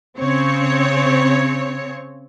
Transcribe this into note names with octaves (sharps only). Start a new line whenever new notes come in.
C#3 C4 C#5